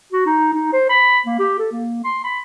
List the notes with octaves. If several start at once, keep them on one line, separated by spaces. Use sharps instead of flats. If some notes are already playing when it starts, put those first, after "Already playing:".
F#4
D#4
D#4
C5
B5
A#3
G4
A4
A#3
C6
B5